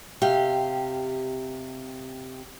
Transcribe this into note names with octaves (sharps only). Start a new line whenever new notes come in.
C3 G4 F5